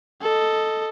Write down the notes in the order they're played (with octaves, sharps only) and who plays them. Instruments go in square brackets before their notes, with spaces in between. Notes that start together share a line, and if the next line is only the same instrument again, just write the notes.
[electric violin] A4 D#5